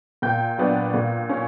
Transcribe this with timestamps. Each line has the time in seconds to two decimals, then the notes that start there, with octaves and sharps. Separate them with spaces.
0.22 A#2 G5 G6
0.58 F#3 B3 D4
0.94 A#2
1.29 C#4